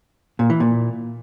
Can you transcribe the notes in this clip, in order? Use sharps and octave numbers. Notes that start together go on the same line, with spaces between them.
A#2
E3
A#2